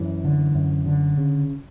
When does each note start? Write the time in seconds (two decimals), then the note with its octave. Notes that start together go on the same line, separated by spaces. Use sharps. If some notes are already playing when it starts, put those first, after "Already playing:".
Already playing: F#2 E3
0.24 D3
0.55 F#2
0.86 D3
1.17 C#3